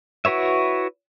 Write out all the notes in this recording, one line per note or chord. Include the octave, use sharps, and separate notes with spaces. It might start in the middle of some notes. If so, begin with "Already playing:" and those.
E4 F#4 B4 C#5 E5